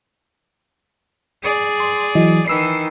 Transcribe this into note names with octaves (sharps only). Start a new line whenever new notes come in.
G#4 D5
C6
E3 F#3 D#5
D#3 E3 E6 C7